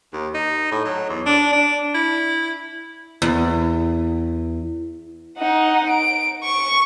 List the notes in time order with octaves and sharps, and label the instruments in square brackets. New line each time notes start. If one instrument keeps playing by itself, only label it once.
[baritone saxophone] D#2
D#4
A2
F#3
E2
D4
D4
E4
[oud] E2
[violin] D#4 F#5
D7
C#6